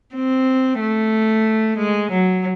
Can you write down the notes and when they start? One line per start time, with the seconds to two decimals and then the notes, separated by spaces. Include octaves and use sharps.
0.15 C4
0.80 A3
1.78 G#3
2.11 F#3